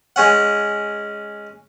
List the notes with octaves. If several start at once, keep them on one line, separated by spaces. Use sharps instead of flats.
G#3 C#4 F#5